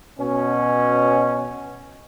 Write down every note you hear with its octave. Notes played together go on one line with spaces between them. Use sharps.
B2 C#4